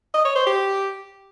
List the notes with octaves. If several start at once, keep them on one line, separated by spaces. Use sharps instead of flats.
D#5
C#5
C5
G4